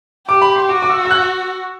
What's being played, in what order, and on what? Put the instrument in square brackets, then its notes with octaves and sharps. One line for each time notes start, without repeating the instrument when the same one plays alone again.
[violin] G4 [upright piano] D6
[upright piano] B5
C6
[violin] F#4 [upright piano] D6
[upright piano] D6
E6
E6
F#6